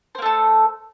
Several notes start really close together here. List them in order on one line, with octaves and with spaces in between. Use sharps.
C5 A#3 A3 A4